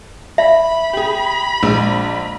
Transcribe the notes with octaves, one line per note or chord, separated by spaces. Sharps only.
E5 B5
G4 G#4
A#1 G#3